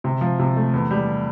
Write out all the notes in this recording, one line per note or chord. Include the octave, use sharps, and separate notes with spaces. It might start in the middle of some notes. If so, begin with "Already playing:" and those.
C3
F3
C3
A3
E2
G3